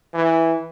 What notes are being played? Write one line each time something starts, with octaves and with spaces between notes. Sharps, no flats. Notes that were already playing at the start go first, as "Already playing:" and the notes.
E3